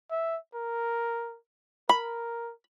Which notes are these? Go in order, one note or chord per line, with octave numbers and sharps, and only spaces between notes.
E5
A#4
A#4 B5